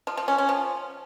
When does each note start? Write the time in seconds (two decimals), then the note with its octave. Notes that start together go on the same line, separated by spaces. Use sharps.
0.07 F3
0.17 F3
0.28 C#4
0.38 C#4
0.49 F3